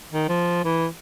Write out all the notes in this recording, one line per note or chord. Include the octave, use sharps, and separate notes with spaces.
D#3
F3
E3